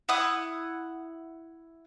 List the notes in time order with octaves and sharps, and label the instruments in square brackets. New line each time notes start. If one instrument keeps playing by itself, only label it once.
[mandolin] E4 F#5 D#6